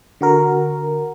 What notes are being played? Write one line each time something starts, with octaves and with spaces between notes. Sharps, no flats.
D3 F#4 A#4